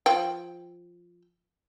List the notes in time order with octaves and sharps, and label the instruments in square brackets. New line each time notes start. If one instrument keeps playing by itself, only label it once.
[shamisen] F3 G5